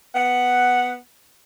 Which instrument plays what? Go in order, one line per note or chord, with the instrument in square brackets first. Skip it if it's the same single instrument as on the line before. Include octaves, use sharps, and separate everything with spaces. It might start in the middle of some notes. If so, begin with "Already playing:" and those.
[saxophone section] B3 F#5